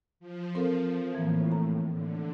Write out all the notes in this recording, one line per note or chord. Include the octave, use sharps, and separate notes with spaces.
F3
C4 A4 A#4
A2 E3 F3 A#3
A#5
D3